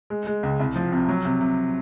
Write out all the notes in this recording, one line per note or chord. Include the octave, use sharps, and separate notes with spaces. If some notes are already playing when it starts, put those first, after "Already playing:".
G#3
G#3
C#2
C2
F3
C3
F#3
C3
C3